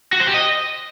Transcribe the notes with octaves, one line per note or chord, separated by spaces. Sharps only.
F#4
C5
G4
D#5